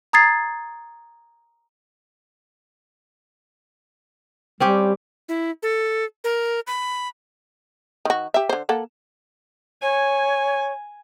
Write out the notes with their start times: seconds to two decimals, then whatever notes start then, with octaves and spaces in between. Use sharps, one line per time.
0.13 A#5 D#6 G#6 A6 C7
4.60 G3 C4 C#4 G4
5.29 E4
5.63 A4
6.24 A#4
6.67 B5
8.05 D#3 F#4
8.34 G4 E5
8.49 D3 C5
8.69 A#3 A4 F#5
9.82 C#5 G#5